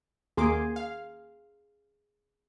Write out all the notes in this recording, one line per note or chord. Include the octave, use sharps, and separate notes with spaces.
D#2 A#3 G#4 C6 D6
F5